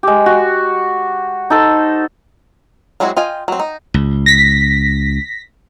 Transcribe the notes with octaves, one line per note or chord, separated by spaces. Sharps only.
G#3 G4
F#4
D#4 A4 C5
F#3 G#3 C4 E4 F#4
F4 D#5 G5 G#5
F#3 C4
D#4
C#2
A#6 B6